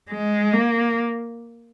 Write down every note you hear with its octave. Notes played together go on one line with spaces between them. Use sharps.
G#3
A#3